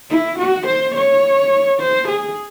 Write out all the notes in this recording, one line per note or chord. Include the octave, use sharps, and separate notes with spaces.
E4
F#4
C5
C#5
C5
G#4